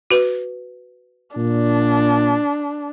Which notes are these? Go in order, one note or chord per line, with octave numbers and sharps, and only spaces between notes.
F#4 B4
A#2 D4